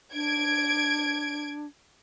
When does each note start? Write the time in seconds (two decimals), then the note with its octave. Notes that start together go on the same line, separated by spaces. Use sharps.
0.14 D4 G#6 D7